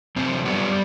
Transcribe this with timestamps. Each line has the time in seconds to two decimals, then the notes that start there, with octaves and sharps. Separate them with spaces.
0.16 F#2 C3 C4
0.45 G3 B3